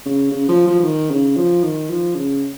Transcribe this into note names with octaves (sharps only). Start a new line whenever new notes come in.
C#3
C#3
F3
F3
F3
D#3
C#3
F3
D#3
F3
C#3